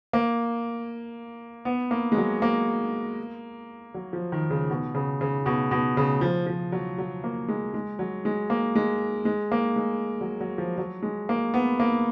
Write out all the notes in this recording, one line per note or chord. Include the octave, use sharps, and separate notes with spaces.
A#3
B3
A#3
G#3
F#3
A#3
F#3
F3
D#3
C#3
B2
C#3
C#3
B2
B2
C#3
F3
F3
F#3
F#3
A#3
G#3
G#3
F#3
G#3
A#3
G#3
G#3
A#3
G#3
F#3
F#3
F3
F#3
G#3
A#3
B3
A#3